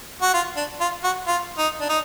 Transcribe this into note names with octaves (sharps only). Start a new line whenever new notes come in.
F#4
F4
D4
F4
F#4
F4
D#4
D4
D#4